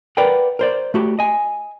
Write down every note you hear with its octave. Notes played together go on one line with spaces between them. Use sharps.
A#4 B4 D5 F#5 G5
A#4 C5 D5
A3 F#4 G4
D#5 G#5